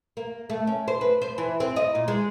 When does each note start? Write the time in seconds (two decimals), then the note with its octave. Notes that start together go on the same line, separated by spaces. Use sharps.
0.17 A#3
0.50 A3
0.67 C#4
0.88 C5
1.01 B4
1.22 C5
1.38 E3
1.60 C4
1.76 D#5
1.95 A#2
2.08 G#3